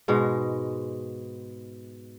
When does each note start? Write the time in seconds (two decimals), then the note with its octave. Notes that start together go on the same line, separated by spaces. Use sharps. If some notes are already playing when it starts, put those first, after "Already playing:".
0.08 G#2 B2 G#3